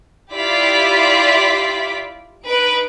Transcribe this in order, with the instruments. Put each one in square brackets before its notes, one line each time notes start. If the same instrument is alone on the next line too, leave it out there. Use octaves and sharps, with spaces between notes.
[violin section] E4 F4 G4 D5 D6 B6
D#4 B4 D7